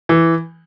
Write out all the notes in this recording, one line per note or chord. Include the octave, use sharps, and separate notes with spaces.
E3